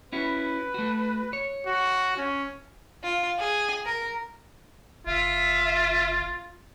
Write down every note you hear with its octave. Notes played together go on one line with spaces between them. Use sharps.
C#4 E4 F#4 B4
A3 F#4
C#5
F#4
C#4
F4
G#4
A#4
F#1 F4 E5